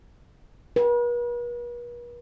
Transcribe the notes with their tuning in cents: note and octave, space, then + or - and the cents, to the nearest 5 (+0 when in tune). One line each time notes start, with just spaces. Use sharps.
B4 -45